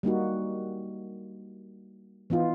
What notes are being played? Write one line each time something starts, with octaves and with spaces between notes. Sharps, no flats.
G3 A#3 D#4 F#4
E3 B3 D#4 F4